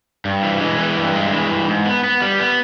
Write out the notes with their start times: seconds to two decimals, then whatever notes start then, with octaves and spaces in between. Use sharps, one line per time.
0.25 G2
0.43 E3
0.61 G#3
0.79 E3
0.96 G2
1.14 G#3
1.32 E3
1.50 G2
1.68 G#2
1.86 B3
2.04 B3
2.22 G3
2.39 B3